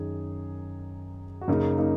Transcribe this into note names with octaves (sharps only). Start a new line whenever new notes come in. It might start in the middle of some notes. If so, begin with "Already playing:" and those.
Already playing: F#2 D#3 D#4 G#4
F#4
F#2 C#3 A#3 D#4
A#3 D#4